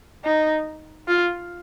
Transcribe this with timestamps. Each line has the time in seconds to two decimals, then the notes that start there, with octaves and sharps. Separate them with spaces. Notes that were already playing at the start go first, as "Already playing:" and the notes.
0.25 D#4
1.08 F4